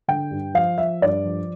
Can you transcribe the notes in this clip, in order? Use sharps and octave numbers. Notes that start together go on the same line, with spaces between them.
D3 G5
G2
F3 F5
F3 E5
G2 D5
F3